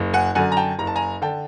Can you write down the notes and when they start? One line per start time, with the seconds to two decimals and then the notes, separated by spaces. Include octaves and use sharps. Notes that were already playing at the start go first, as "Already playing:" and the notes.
Already playing: F#1
0.14 F#5 G#5
0.35 F#2 D3 F#5 G#5
0.52 A#5
0.57 G5 A5
0.79 F#1 A#5
0.87 A5
0.96 G#5 A#5
1.22 D3 G5 A5